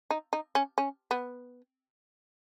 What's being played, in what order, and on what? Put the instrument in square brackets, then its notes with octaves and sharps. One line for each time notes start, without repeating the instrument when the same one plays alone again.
[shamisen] D#4
D#4
C#4
C#4
B3